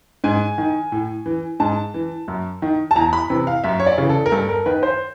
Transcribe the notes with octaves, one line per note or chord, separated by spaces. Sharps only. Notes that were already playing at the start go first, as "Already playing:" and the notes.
G#2 G#5
D#3
A2
E3
G#2 A5
E3
F#2
D#3
A5
E2 A#5
B5
C3 E3
F5
F#2 E5
C#5
D5
C#3 E3
A4
A#4
G2 A4
A#4
D#3 B4
C5